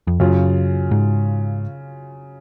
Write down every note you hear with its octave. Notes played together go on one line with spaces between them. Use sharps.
F2
F#2 C#3 F#3 C#4 F4
G#2